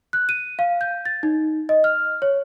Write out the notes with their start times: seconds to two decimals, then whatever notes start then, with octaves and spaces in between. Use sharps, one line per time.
0.13 F#6
0.29 D#7
0.59 F5
0.81 G6
1.05 A6
1.23 D#4
1.69 D#5
1.84 F6
2.22 C#5